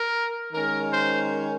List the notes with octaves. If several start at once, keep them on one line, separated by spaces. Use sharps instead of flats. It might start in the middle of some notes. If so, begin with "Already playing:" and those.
Already playing: A#4
D#3 G#3 C#4 A#4
C5